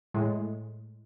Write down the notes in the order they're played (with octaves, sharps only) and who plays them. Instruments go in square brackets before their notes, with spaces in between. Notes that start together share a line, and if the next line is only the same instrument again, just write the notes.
[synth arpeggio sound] A2 G#3